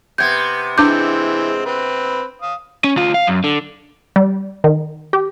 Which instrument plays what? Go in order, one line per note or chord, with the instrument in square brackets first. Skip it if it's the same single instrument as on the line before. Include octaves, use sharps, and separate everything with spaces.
[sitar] C3 B3 [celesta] G6 G#6
[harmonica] E3 G#3 C4 [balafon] D4 D6 [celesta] G6
[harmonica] C4 B4
F5 D#6
[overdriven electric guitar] C#4
D2 F4
F5
F#2
D3
[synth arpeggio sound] G3
D#3
G4